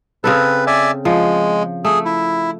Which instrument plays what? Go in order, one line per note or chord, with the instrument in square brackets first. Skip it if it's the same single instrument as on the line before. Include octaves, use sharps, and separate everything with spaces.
[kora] C#3 C4 A4 [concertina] B4
[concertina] D5 E5 G#5
[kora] F3 [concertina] G#3
[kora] A3 [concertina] G#4
[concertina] E4